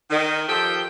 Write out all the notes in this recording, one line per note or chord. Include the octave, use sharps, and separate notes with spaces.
D#3
D#3 F3 G4 A4 G5